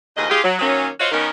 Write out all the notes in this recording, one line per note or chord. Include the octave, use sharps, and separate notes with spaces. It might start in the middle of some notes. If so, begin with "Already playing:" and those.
D#2 A2 F3 G#4 D#5
F4 G4 G#4
F#3
D#3 F#3 A#3 C#4
F4 F#4 C5 C#5 D#5 F5
D#3 B3 C#4 D#4 A#4